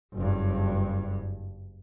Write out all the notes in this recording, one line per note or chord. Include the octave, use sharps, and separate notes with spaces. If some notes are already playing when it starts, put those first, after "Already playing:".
F#1 G2